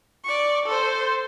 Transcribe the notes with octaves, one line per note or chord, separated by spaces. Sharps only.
D5 C#6
A4 C5